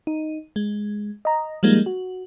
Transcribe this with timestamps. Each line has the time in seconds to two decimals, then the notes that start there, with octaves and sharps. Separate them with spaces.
0.07 D#4
0.56 G#3
1.25 D#5 A#5
1.63 F3 G3 G#3 A#3 D#4
1.86 F#4